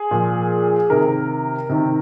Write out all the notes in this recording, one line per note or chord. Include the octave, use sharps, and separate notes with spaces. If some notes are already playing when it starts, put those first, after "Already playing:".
Already playing: G#4
A#2 F3
C3 D#3 A#4
C3 D#3